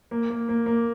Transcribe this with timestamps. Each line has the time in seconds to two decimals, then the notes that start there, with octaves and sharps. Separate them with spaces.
0.11 A#3
0.30 A#3
0.49 A#3
0.66 A#3